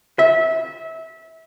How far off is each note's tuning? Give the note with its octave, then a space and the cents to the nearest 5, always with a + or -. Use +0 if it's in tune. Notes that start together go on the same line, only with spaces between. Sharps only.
E5 -25